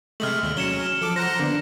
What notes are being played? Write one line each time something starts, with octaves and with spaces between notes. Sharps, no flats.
C3 G#3 A3 F6 F#7
D#2 A#2
F#3 C#4 C#7 E7 G7
F3 A4 D6
C5 F#5 A#5 A#6
D3 A#3 B3 D4